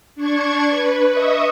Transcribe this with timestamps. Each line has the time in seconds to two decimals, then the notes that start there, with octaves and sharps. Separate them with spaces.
0.16 D4 C#6 G#6
0.69 B4
1.12 D#5 E5 C#6 D#6